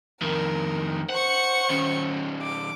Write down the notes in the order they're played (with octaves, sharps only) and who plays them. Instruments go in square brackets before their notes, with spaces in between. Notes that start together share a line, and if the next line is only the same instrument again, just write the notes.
[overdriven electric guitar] F2 D#3 [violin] A#4
[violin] C5 C#6 [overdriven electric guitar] F#5
[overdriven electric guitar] D#3 C#4
[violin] D6